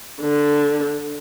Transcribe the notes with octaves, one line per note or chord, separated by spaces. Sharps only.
D3